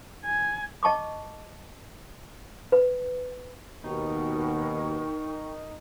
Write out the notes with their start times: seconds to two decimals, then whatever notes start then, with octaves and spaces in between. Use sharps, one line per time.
0.25 G#5
0.83 D#5 A5 C#6 D6
2.72 B4
3.84 D#2 B2 D#4 A#4 G5 C#6